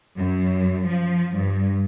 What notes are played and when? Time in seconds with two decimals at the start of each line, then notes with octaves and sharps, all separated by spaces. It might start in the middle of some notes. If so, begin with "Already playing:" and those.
0.18 F#2
0.87 F3
1.37 G2